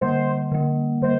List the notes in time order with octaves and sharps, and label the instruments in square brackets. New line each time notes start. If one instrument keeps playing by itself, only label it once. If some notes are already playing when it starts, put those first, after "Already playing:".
[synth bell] D3 G3 A#3 [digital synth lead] C5
[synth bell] D3 G3 A#3
[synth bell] D3 G3 [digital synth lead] C5